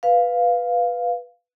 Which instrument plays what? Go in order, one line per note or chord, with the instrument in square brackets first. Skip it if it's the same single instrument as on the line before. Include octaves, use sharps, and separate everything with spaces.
[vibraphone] B4 F5